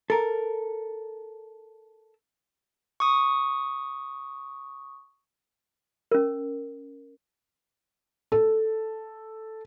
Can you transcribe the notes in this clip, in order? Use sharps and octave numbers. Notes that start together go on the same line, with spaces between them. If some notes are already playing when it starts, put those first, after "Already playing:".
A4 A#4
C#6 D#6
C#4 A#4
A4